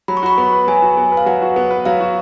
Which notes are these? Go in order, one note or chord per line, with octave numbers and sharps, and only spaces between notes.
F#3 B5
C#6
F#4 B5
B3
B4
F#3 G#5
F#4
B3
B4
F5
F#3 F#5
F#4
B3
B4
F#3 F5
F#4